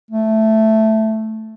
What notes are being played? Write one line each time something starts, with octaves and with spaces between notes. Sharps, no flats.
A3